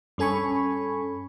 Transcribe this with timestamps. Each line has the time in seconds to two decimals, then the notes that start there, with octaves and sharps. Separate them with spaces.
0.18 G2 C#4 A4 G#5 B5 C#6